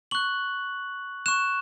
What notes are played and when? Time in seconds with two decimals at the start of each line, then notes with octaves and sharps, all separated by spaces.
0.11 C#6 F#6 F#7
1.26 C#6 F#6 E7